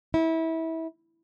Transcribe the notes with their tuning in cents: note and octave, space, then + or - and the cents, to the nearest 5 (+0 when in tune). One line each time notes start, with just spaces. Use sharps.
E4 -25